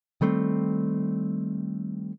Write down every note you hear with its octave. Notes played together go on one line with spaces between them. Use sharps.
D#3 G3 A3 C4